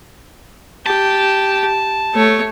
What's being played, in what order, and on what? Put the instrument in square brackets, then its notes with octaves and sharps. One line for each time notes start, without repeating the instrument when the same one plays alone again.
[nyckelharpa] G4 [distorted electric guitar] A5
[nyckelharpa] A3 C#5